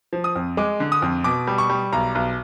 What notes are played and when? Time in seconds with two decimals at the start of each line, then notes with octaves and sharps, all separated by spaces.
0.13 F3
0.24 D#6
0.36 F2
0.57 G#3 D6
0.80 D3
0.92 D#6
1.02 F2
1.24 B2 D6
1.47 G3
1.58 C#6
1.70 G3
1.92 B1 A#5
2.15 B1